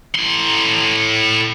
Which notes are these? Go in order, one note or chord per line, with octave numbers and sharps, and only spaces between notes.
A2 C6